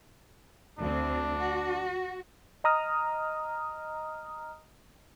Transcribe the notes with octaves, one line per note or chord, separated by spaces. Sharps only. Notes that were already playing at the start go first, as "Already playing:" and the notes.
D2 C4 D4
F#4
D#5 A#5 D#6 F6